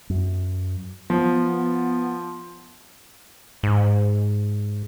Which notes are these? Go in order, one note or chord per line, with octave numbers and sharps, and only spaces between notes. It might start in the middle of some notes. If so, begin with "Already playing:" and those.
F#2
F3 B3
G#2